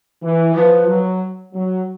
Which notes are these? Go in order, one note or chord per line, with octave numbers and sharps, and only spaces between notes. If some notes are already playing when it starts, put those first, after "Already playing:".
E3
F3 B4
F#3
F#3